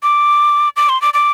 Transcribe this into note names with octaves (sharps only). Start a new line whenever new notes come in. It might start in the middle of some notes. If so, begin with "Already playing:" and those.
D6
D6
C6
D6
D6